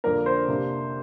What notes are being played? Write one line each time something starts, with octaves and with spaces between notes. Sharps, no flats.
F2 D3 A#3 D4 A#4
C5
C3 A#3 D4